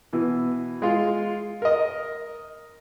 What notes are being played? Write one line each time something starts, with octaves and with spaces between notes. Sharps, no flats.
B2 E3
G#3 F4
A#4 D#5